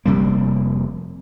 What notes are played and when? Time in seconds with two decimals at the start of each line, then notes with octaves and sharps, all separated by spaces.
0.06 F1 C3 G3 A#3